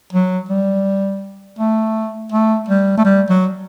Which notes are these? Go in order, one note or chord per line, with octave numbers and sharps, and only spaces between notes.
F#3
G3
A3
A3
G3
A3
G3
F#3